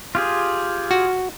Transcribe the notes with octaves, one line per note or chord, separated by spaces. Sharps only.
F4 G4 G#4
F#4